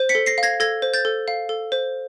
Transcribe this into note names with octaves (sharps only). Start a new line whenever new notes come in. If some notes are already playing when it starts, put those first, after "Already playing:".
Already playing: C5
B6 C#7
A4
A#6 C7
F5
G#6 A#6
A4 G#6 A#6
C5
G6 A6
A4
F5
A4
C5